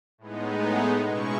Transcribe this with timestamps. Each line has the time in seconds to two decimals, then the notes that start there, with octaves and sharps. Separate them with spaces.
0.18 A2 G#3 B3 D#4
1.06 B2 G#3 C#4 E4 C#6